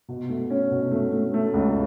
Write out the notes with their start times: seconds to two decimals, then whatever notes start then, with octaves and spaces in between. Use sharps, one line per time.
0.09 B2
0.29 A3
0.50 C#4
0.72 B2
0.91 A3
1.12 A3
1.34 A3
1.54 C#2